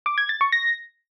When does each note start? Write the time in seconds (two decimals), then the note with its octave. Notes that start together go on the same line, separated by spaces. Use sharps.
0.06 D6
0.18 G#6
0.29 A6
0.41 C#6
0.52 A#6